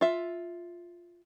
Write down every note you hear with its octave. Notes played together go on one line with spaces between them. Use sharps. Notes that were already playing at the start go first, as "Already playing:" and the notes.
F4 E5